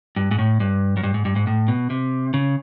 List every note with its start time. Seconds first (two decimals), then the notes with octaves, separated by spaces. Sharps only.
0.16 G2
0.31 G#2
0.38 A2
0.60 G2
0.97 F#2
1.03 G2
1.14 G#2
1.25 G2
1.36 G#2
1.47 A2
1.68 B2
1.90 C3
2.34 C#3